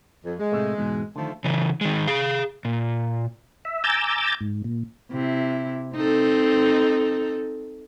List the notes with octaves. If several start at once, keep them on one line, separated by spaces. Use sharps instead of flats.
F2
G#3
A2 C3 A3
E2 G#2 B2
D3 D#3 F3 A3
C#3 E3
D#3 G#3
G#4 F5
A#2
E5
G#5 A#5 D6 E6 G6 A6
G#2
A#2
C3 E4
C4 D#4 A4